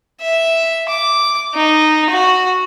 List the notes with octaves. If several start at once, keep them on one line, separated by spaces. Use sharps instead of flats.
E5
D6
D#4
F#4